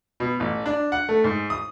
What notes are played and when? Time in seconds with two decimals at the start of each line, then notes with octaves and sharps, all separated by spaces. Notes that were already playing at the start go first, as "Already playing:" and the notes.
0.20 B2
0.40 A1
0.66 D4
0.92 F#5
1.09 A3
1.24 G#2
1.50 D#6